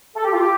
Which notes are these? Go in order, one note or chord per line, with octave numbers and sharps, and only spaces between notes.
A4
G4
F4
G4